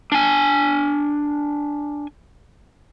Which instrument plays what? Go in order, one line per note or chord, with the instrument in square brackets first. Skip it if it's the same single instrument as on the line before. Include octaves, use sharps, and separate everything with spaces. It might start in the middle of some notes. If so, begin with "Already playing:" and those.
[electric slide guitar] D4 G#5